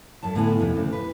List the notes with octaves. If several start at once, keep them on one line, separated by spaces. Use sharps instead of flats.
F#2 C#5 A5
A2 D3 B3 E4 F#5 G#5
F2 A2 C3 D#3
D2 C#3
B4